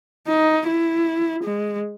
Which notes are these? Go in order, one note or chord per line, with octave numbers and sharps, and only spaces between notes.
D#4
E4
G#3